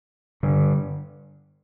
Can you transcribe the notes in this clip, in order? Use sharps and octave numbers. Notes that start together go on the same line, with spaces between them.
G2 D3